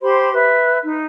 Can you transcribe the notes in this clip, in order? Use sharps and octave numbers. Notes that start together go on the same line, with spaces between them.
G4 C5 B5 C6
B4 E5
D#4